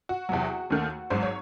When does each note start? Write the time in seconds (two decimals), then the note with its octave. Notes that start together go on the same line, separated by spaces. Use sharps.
0.09 F#4
0.29 E2 C3 F#3
0.70 D#2 D#3 A3
1.10 G#1 G#2 F#3 C5
1.23 C#5